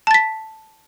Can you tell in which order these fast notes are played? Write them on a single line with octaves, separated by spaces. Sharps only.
A5 A6 B6